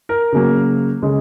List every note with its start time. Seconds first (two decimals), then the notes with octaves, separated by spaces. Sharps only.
0.09 A#4
0.32 C#3 F#3 A#3
1.02 C#3 G#3